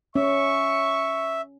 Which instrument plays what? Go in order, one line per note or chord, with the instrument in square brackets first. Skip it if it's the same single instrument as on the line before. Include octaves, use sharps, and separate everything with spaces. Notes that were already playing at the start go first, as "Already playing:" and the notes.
[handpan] C#4 [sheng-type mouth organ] E5 [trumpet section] C#6